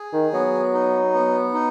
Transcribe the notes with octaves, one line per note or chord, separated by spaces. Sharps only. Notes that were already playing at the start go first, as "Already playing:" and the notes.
Already playing: G#4
D#3
F#3 B3
D#4
B3
D#4